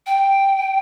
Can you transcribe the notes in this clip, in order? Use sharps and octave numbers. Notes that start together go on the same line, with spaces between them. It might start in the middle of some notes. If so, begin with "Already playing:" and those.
G5